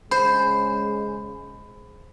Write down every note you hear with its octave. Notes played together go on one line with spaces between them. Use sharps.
C#3 G#3 C5 B5